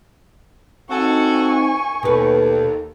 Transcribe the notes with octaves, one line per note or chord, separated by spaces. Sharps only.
C4 D#4 F#4 A4 G#5 C#6
D#2 B2 A4 B4